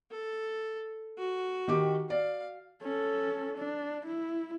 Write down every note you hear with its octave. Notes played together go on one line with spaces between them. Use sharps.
A4
F#4
D#3 G4 D6
D5 F5
C#4 A4
D4
E4